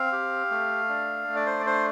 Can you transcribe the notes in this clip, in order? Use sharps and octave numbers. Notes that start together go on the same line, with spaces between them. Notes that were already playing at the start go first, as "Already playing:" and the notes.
Already playing: C4 F5
G4
A3
D4
A3
D5
C5
D5
D4 C5